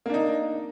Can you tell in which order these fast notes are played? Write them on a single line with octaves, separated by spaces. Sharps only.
A#3 D4 D#4